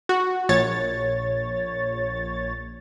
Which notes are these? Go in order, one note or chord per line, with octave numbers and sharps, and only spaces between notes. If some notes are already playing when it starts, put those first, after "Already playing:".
F#4
A#1 C#5 A6